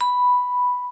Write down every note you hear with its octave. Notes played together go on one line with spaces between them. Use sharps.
B5